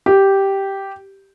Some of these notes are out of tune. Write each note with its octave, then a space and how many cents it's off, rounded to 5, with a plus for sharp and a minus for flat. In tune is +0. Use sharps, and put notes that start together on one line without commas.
G4 -5